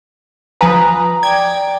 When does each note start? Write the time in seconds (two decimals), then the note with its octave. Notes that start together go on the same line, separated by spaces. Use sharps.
0.61 F3 B4 G#5 A#5 D#6
1.23 D5 G5 G#6